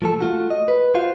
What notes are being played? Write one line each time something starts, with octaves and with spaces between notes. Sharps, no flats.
F3 A3 A4
A3 F4 F#4
D#5
B4
F4 F#4 C5 F5